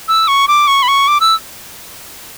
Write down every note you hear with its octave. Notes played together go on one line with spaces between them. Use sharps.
E6
C#6
D6
C#6
B5
C#6
D6
E6